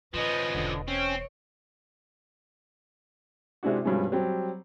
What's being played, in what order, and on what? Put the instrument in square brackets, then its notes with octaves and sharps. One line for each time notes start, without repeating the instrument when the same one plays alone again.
[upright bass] D#3 [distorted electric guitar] F3 C#4 [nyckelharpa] B4 D#5
[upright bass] E1 E3 [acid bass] D3
[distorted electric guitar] C4 [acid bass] C#4 [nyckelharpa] C#5
[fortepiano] C3 G#3 D4 E4 F#4
G2 B2 F3 G#3 C#4
F#3 G3 C4 G4